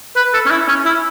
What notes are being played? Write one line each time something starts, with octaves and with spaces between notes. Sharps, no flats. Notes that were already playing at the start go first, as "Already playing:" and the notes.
B4
A4
C#4
E4
C#4
E4